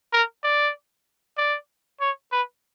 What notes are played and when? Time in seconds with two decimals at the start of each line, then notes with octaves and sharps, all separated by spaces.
0.13 A#4
0.43 D5
1.38 D5
2.01 C#5
2.32 B4